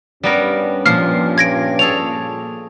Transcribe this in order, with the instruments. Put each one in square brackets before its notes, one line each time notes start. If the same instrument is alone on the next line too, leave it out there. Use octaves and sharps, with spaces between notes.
[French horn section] G2 C#4 [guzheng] G3 B3 A#4
[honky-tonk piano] A#2 [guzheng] F3 [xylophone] F6 C7
[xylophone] G#6 A#6 D7
[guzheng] G#4 A4 C#5 [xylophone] F7